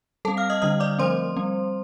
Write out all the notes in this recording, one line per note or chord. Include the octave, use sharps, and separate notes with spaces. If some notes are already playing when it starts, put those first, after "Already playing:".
G3 C4 A4 A5
F5 F6
D#5 D#6
D3 G3 D4 D#5 D#6
D5 D6
F3 A3 C4 C5 C6
G3 C4